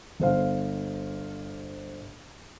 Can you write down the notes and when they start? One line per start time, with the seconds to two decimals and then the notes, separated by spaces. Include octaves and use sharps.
0.20 G1 C5 F5